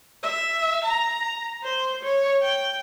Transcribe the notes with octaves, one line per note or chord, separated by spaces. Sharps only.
E5
A#5
C5
C#5
G5